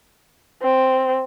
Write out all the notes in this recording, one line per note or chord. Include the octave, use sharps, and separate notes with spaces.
C4